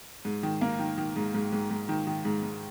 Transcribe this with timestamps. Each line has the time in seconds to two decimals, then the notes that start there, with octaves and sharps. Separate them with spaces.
0.25 G#2
0.43 D#3
0.61 A#3
0.79 D#3
0.98 D#3
1.16 G#2
1.34 G#2
1.52 G#2
1.71 G#2
1.89 D#3
2.07 D#3
2.25 G#2
2.43 G#2